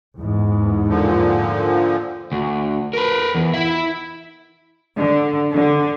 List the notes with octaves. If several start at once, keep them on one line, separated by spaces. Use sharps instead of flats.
E2 G#2
A#2 D3 F3
D2
A#4 B4
E2
E4 E5
D3
D3